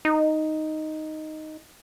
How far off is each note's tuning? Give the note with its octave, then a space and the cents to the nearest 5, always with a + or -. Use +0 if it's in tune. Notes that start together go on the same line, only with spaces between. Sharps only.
D#4 +0